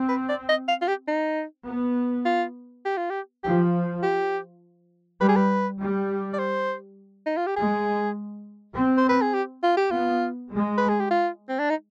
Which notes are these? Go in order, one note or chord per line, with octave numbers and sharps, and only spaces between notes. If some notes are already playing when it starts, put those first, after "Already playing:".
Already playing: C4
B4
D5
D#5
F5
F4
G4
D#4
B3
F4
G4
F4
G4
F3 G4
G4
G3 B4
G#4
B4
G3
D5
C5
D#4
F4
G4
G#3 G#4
C4
C5
B4
G#4
G4
F4
G4
B3 F4
G#3
B4
G#4
G4
F4
C4
D4
D#4